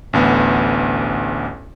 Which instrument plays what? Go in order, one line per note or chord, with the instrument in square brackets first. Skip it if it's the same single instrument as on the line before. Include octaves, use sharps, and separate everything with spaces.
[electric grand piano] A1 D2 B3